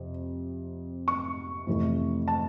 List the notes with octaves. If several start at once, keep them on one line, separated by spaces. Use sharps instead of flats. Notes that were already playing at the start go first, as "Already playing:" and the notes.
Already playing: F2 C3
C#6
F2 C3 E3 A3
A5